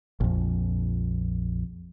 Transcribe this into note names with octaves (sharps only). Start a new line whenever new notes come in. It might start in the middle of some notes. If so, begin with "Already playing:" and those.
A#1 F2